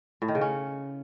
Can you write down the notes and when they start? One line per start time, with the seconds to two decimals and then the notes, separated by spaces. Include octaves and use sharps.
0.22 A2
0.28 D#3
0.35 C#3
0.41 C#4